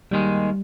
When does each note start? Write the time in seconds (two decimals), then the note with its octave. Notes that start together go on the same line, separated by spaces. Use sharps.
0.11 D#2 D#3 G3 G#3